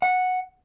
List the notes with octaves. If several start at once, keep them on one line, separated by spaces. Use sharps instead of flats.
F#5